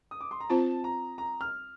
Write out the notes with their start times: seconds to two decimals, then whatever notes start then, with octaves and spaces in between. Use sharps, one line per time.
0.11 D#6
0.21 D6
0.31 C6
0.40 A#5
0.49 C4 F4 C5 A5
0.84 A#5
1.18 A#5
1.41 F6